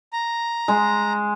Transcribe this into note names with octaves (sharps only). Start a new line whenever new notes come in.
A#5
G#3